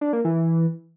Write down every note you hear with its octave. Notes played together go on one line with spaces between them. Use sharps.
D4
A#3
E3